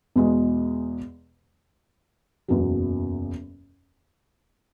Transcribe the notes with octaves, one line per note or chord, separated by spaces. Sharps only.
E2 B2 G#3
F#1 E2 B2 F#3